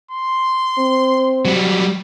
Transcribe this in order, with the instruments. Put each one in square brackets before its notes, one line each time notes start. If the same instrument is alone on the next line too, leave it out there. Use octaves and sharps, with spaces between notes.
[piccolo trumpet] C6
[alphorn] C4
[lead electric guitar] F#3 G3